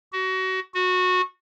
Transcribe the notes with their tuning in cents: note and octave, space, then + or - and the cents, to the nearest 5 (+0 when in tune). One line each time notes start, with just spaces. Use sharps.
F#4 +25
F#4 -20